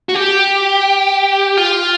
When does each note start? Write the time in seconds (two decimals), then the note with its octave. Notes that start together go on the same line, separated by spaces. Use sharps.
0.09 F#4
0.15 G4
1.57 F4